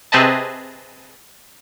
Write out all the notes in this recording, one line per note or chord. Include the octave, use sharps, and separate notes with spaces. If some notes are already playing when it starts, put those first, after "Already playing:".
C3 C4 G#4 B4 D#5 A5